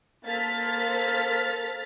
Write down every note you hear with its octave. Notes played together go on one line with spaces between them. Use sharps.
A#3 A4 C5 F6 A6 B6